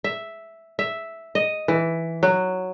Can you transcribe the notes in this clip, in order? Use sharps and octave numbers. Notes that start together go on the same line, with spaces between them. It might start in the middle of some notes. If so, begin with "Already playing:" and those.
E5
E5
D#5
E3
F#3